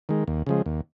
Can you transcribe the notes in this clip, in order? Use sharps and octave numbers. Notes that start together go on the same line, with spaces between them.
D#3 G#3
D#2
C#3 F3 G#3
D#2